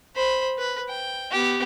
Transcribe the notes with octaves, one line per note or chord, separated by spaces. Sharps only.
C5 B5
B4
G5
B3 G4